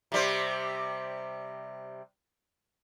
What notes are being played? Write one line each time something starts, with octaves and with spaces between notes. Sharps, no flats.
C3 G3 C5